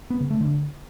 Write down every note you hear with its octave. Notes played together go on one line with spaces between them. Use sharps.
B3
C#3
A3
D3